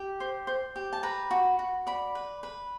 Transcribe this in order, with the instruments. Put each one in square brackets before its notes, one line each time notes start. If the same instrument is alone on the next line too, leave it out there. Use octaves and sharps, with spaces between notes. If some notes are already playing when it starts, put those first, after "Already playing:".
Already playing: [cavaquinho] G4
C5
C5
G4
A5
B4 A#5
F#4
F#4
D5 B5
B4
B4